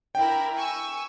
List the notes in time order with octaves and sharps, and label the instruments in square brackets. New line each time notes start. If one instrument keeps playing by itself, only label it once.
[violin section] D4 E4 A#4 [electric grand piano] G5
[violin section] G#5 C#6 E6